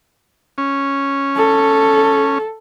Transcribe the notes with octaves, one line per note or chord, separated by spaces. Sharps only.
C#4
A4